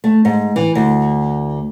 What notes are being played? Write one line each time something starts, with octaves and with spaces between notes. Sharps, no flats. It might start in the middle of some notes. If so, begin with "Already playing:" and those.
A3
G#2
E3
D2